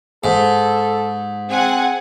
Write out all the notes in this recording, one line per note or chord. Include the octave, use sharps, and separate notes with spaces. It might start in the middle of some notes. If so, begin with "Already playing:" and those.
G#2 A4
C4 G#4 F#5 G#5